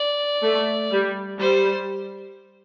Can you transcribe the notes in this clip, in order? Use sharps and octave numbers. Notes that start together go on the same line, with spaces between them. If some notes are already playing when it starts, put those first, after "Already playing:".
Already playing: D5
A3
G3
G3 C5